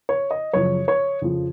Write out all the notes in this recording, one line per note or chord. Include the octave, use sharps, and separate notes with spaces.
C#5
D#5
F#2 C#3 F3 C#5
C#5
F2 C#3 F3